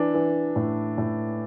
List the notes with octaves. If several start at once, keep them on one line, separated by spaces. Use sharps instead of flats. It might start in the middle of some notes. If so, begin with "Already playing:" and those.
Already playing: E3 D4
E3
A2
A2